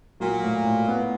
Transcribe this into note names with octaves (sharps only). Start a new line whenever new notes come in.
A#2 F#3
A2
A2
B3